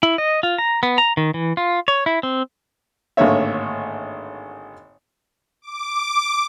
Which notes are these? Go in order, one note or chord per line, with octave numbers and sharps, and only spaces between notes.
E4
D#5
F4
A#5
B3
A#5
D#3
E3
F4
C#5
E4
C4
G#1 A2 D3 A#3 C#5 E5
D6